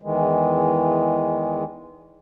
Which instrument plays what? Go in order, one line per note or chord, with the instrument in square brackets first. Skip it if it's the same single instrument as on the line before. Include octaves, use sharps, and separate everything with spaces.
[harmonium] E2 D#3 E3 G#3